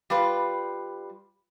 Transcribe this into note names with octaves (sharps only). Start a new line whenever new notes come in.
G3 F4 B4